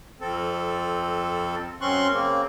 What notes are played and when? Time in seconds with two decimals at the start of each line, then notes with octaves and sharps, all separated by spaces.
0.21 F2 C4 A4
1.81 F#2 C4 C#4 C6 C#6 F#6
2.12 C#3 A#3 C4